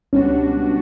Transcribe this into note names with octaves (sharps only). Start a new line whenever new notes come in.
C#2 B2 G3 C#4 D4 F#4